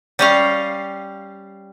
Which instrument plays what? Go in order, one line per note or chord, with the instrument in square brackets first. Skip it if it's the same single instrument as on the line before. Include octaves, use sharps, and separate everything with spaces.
[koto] G3 C#4 F5